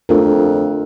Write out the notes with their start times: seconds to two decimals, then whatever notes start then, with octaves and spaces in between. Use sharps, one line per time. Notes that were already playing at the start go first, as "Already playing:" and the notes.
0.09 F2 A3 D4 F4 A#4